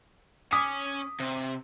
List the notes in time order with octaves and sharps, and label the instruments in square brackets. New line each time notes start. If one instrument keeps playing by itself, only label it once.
[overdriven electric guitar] C#4 G#5 [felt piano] D6 D#6 B6
[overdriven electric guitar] C3